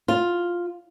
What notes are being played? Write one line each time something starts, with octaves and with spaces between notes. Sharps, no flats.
F4